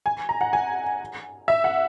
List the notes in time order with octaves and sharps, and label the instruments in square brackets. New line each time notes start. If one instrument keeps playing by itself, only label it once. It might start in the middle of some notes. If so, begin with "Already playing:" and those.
[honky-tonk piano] G#5
A#5
F#5
G#5
E5
F#5